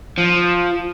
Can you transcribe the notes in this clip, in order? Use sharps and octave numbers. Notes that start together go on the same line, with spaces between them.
F3